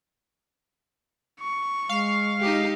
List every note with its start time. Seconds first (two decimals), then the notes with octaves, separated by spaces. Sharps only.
1.40 C#6
1.89 G#3 F5
2.41 D#4 G4